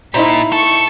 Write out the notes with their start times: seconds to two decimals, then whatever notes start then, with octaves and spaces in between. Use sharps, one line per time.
0.14 A#2 D#4 E4 C5 B5
0.52 A4 C#6